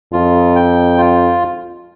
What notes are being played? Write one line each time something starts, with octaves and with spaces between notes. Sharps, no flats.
F2 F4
G5
F4